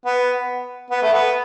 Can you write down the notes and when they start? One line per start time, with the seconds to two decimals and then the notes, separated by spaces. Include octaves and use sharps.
0.06 B3
0.90 B3
1.02 A3
1.13 B3